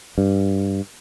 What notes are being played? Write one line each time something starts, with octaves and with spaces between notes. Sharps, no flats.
G2